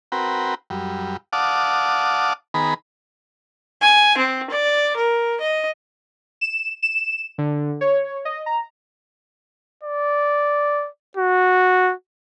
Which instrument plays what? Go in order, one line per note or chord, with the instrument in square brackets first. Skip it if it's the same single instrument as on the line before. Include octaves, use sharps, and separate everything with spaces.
[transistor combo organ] C4 F#4 A#4 B4 G5
F#2 G3
D5 F5 F#5 A5 D6 D#6
D#3 B3 G#4 A#5 B5
[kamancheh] G#5
C4
D5
A#4
D#5
[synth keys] E7
E7
D3
C#5
D#5
A#5
[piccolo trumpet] D5
F#4